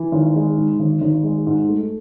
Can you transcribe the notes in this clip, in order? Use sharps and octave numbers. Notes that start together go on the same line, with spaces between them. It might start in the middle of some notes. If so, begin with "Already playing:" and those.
Already playing: E3
G#1
G#3
G#2
G#1
G#1
G#3
G#2
A3